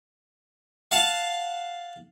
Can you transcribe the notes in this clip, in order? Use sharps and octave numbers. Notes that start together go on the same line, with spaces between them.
F5 F#5 A5